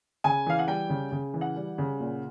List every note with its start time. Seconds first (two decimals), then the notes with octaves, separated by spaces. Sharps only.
0.24 C#3 G#5
0.46 E3 F5
0.59 F#5
0.67 G3 G5
0.89 C#3
1.12 C#3
1.34 E3
1.41 F#5
1.56 G3
1.78 C#3
2.00 A#2